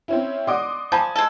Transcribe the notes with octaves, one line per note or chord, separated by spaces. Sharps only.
C4 C#4 E4 E5
D5 D#5 F#5 C6 D6 D#6
F3 G#5 A5 B5
G#3 A4